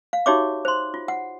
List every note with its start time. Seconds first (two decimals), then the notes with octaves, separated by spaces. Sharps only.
0.13 F5
0.26 D#4 F#4 G4 C#5 E5 D6
0.65 C5 C6
0.94 F4
1.08 F#5